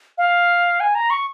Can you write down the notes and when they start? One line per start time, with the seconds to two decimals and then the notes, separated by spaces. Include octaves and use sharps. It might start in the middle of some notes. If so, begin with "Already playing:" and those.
0.18 F5
0.80 G#5
0.95 A#5
1.10 C#6